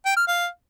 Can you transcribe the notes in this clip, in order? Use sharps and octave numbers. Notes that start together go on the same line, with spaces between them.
G5
F6
F5